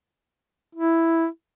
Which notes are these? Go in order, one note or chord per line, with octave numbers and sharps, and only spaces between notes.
E4